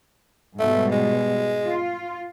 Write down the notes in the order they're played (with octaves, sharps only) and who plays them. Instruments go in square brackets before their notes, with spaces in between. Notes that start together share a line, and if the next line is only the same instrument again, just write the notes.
[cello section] G#2 B2 G3 [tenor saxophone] A3
[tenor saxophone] G#3
[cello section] F4